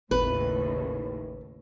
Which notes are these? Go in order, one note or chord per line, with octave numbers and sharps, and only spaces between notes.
G#1 D#2 A2 C#3 B4